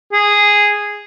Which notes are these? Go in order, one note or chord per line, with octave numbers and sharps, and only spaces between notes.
G#4